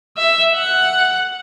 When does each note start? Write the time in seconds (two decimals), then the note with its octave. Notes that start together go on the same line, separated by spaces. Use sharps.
0.17 E5
0.55 F#5